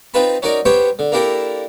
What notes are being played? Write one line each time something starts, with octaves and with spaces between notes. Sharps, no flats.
C4 D#4 F4 B4 A5 B5
C#4 D#4 F#4 A#4 D5
B3 G4 C5 C#5 E5 G5
D3
A#3 D4 E4 G4 A4 A#4